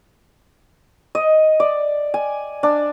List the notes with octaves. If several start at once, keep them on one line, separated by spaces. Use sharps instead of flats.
D#5
D5
G#5
D4